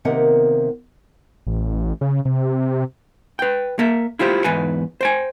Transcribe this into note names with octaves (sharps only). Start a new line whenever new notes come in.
C3 D#3 A#3 B3 A#4 F#5
A1
C#3
C3
B4 G5
A#3 A#4 E5
E4 F4 G4 C5
E2 G#2 B4 G#5
C5 G5 G#5